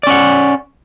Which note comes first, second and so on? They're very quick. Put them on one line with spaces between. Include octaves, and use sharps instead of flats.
D5 C#4 F#5